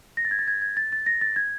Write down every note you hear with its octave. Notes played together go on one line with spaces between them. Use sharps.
A#6
A6
G#6
A6
G#6
G#6
A6
A6
A#6
A6
G#6